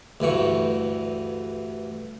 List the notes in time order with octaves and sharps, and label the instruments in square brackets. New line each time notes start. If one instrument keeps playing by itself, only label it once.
[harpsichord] D2 G2 E3 C#6